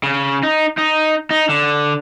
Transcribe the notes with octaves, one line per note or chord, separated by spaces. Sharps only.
C#3
D#4
D#4
D#4
D3